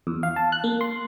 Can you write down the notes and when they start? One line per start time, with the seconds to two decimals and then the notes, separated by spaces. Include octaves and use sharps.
0.07 E2
0.23 F5
0.36 A5
0.52 F#6
0.64 A#3
0.81 C6